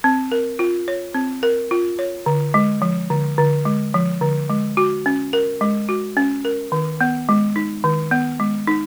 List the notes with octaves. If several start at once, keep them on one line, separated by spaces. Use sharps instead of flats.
C4
A#4
F4
C#5
C4
A#4
F4
C#5
D3
G#3
F3
D3
D3
G#3
F3
D3
G#3
F#4
C#4
A#4
G#3
F#4
C#4
A#4
D#3
B3
G#3
D#4
D#3
B3
G#3
D#4